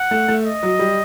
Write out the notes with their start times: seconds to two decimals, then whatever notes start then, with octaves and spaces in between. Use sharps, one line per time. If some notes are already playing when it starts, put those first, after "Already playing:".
Already playing: F#5
0.11 A3
0.28 A3
0.45 D#5
0.63 F#3
0.79 G3